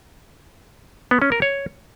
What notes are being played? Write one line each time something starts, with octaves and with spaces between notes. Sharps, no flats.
B3
C#4
A#4
C#5